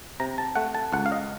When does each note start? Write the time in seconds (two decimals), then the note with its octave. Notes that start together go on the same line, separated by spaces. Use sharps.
0.20 C3 A#5
0.38 A5
0.56 A3 F#5
0.75 A5
0.93 C#2 F#5
1.06 F5
1.12 D#5